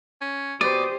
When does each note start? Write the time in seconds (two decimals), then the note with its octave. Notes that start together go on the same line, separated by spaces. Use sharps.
0.21 C#4
0.61 B2 G4 C5 D5 D#6